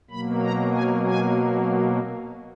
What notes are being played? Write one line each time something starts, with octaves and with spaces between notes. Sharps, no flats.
B2 F#3 A#3 B5
A#5
G#5
G#5